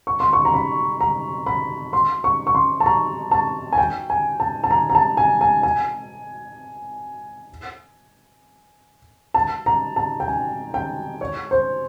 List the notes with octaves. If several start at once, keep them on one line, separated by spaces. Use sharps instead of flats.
C#6
C6
C#6
A#5
B5
A#5
B5
C6
C#6
C#6
C6
A5
A#5
A5
G#5
G5
G#5
A5
A5
A#5
A#5
A5
G#5
G#5
G#5
A5
A#5
A5
G5
G#5
G5
C#5
C5